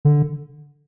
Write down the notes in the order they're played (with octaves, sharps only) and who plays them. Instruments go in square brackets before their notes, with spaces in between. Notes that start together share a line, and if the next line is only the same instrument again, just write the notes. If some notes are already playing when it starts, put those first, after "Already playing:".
[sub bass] D3